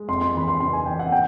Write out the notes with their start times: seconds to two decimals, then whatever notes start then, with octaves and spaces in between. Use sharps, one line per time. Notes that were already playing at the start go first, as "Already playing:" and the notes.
Already playing: G#3
0.08 F2 C6
0.21 C6
0.34 E3 B5
0.48 C6
0.60 C#3 C6
0.73 G#5
0.86 E3 G5
0.99 F#5
1.12 G5